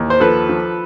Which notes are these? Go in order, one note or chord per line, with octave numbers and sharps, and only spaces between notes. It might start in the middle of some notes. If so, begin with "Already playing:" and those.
Already playing: D#2 E3
C5
F3 A4 B4
F3